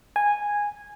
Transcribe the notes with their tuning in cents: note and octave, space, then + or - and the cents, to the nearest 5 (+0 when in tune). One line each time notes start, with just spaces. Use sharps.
G#5 -10